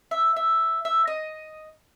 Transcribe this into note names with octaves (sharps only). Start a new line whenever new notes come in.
E5
E5
E5
D#5